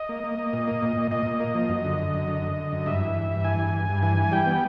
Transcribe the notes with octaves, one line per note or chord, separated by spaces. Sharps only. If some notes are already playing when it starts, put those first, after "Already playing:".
Already playing: D#5
A#3
A#3
A#3
A#2
A#3
A#2
A#2
A#2 D#5
A#2
A#3
F3
F#2
D3
D3
F#2
D3
D3
D3
F#2
G2 E5
E3
G2
G2
E3 G#5
G2
G2
G2
E3 G#5
E3
G3 G5
B3